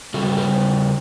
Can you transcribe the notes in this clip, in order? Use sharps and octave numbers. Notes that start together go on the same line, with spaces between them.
C#3 G3 F#4 A4
A4
G4 B4